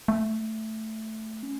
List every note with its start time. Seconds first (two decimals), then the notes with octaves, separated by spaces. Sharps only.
0.08 A3
1.43 C#4